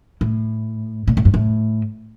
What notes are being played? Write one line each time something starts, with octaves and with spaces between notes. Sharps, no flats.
A2
A#2
A2
G2
A2